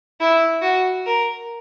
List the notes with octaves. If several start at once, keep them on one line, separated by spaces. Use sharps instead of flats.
E4
F#4
A#4